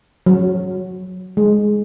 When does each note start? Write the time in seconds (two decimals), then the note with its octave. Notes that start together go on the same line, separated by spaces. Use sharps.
0.26 F#3
1.37 G#3